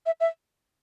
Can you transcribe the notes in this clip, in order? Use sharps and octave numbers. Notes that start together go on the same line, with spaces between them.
E5
E5